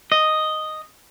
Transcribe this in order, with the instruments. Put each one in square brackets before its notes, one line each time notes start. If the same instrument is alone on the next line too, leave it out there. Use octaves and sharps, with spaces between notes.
[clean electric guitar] D#5